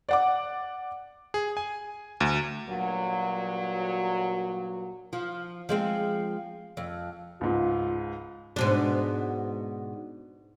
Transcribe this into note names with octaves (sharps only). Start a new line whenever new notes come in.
D5 F#5 D6
G#4
G#5
D2
G2 A#2 F#3
F3
F3 G#3 C4
F2
C#2 G#2 F4
G#2 B2 D4